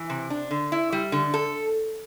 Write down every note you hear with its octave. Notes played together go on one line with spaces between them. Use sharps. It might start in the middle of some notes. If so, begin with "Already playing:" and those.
Already playing: E3
C3
D4
D3
E4
G3
D3
A4